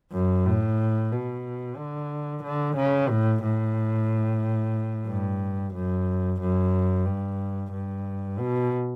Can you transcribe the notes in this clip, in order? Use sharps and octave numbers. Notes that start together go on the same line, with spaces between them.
F#2
A2
B2
D3
D3
C#3
A2
A2
G2
F#2
F#2
G2
G2
B2